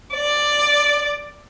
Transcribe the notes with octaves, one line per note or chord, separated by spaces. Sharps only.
D5